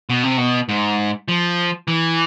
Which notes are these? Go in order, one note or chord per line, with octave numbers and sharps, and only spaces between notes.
B2
C3
B2
G#2
F3
E3